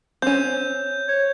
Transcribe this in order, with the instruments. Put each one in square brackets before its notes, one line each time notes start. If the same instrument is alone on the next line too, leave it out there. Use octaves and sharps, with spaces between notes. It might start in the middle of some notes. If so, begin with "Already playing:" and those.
[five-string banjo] C4 C#4 [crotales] G6
[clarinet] C#5